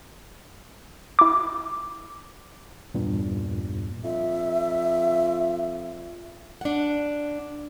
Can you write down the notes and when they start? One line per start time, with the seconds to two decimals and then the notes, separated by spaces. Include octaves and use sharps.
1.19 E4 D6
2.94 E2 G2 A#2
4.04 F2 E5
6.61 D4 F#5